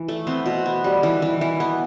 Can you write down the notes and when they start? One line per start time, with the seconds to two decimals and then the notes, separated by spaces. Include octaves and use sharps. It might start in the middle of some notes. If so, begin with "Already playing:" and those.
Already playing: E3
0.08 A3
0.27 B3 C4
0.46 B2
0.66 B3
0.84 G3
1.03 E3
1.22 E3
1.41 E3
1.60 B3